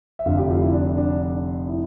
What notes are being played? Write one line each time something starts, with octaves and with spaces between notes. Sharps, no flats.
E5
F1 F2 D3 F5
G4
F4
E4
D4
D4
E4